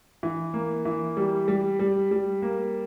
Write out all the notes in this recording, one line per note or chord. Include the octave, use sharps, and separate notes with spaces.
E3
A#3
E3
G3
G3
G3
G3
A#3